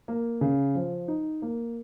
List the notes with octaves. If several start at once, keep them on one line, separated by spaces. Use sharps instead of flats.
A#3
C#3
F3
D#4
A#3